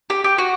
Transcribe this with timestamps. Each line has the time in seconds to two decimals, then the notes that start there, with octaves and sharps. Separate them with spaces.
0.10 G4
0.24 G4
0.38 F#4